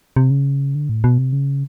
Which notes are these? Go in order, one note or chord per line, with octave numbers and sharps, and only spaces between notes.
C3
C#3
D3
A2
B2
C3
C#3